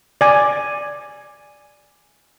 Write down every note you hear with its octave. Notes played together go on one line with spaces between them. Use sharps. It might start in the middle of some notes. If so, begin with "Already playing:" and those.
D5 G#5